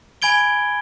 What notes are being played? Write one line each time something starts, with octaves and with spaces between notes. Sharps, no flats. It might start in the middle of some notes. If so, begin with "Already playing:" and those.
G#5 B5 G#6 D7 G7